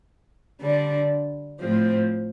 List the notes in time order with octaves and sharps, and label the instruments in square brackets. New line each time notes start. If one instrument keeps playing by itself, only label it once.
[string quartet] D3 G3 D4
A2 F3 C4